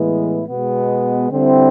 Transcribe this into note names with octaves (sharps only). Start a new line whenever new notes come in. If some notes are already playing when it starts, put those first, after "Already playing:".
Already playing: A2 E3 G#3 B3 E4
B2 G#3 B3
D3 G3 C4 E4